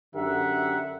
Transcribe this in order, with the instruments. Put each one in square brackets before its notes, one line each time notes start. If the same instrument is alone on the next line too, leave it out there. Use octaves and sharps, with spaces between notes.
[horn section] F#2 D3 G4 A#4 E5 F#5